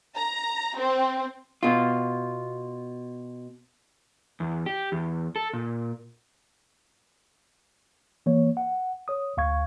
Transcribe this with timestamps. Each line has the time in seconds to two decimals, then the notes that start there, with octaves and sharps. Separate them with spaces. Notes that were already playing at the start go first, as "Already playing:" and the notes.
0.16 A#5
0.76 C4
1.63 B2 F4
4.40 E2
4.66 G4
4.92 E2
5.36 A4
5.53 A#2
8.26 E3 A#3 C#5
8.57 F#5
9.08 C#5 D#6
9.37 D2 F5 C#6 G#6